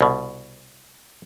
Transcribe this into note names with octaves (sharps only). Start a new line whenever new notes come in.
C2 B2